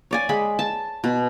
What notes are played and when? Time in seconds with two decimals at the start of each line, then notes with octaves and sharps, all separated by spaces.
0.11 C#5 D5 G#5
0.29 G#3 G#4 B5
0.59 A5
1.04 B2